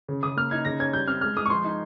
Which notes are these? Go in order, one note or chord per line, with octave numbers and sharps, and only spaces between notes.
C#3
C#3 D#6
A#3 F6
D#4 G#6
C#3 A#6
C#4 G#6
G3 G6
C4 F6
G#3 F6
G#3 D#6
C#6
F3 C6
D#4